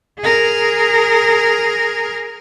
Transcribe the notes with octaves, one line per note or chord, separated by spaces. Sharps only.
G#4 A#4